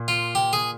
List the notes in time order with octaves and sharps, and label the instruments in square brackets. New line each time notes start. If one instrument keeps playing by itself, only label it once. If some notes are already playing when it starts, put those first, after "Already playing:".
Already playing: [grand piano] A#2
[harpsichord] F4
G4
G#4